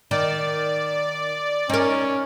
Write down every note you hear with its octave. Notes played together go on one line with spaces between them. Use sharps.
D#3 D5
C#4 D#4 A#4